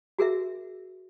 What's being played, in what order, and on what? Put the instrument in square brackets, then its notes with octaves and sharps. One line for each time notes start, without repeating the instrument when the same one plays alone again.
[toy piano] F#4 G#4 A#4 E5